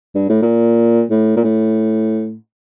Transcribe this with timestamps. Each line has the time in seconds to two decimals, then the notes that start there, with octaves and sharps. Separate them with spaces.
0.15 G2
0.29 A2
0.42 A#2
1.10 A2
1.36 A#2
1.44 A2